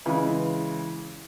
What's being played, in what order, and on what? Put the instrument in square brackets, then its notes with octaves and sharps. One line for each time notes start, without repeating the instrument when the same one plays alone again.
[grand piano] C#3 E3 G#3